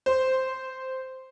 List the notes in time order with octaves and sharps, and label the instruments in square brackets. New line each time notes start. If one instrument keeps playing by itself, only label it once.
[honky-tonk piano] C5